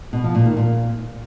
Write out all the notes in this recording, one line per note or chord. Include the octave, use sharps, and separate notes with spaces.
B2
F3
A#2
D#3
A#2